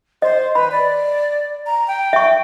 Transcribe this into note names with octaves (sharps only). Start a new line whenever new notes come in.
C5 D#5
B4 B5
D5
A#5
G5
E5 C#6